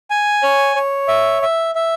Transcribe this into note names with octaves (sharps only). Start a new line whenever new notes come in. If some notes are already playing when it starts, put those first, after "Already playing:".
G#5
C#5
C#5
E5
E5
E5